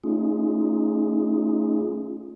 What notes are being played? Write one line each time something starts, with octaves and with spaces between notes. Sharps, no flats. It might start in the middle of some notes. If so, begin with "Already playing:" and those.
A3 C#4 D#4 F4 G#4